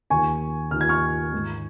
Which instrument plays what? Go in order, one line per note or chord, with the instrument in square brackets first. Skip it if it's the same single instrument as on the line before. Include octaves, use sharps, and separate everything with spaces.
[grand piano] D#2 D#3 G#5 C#6
D#2 D#3 F6
G#6
C#6 F6
G#2 D#3